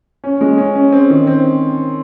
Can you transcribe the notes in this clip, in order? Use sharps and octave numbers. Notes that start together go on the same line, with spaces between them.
C#4
G#3
C#4
C#4
C4
D#3
C4